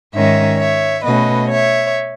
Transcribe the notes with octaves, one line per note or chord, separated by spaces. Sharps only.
G#2 D#3 G#3 C#4 C#5 E5
C#5 E5
B2 A3 C#4 B4 D#5
C#5 E5